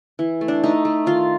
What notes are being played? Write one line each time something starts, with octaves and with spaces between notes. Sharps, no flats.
E3
A3
D4
A3 D#4
A3
D#3 F4